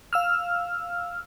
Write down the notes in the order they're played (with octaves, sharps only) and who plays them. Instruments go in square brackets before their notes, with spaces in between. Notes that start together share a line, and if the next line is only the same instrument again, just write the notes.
[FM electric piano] F5 E6 F6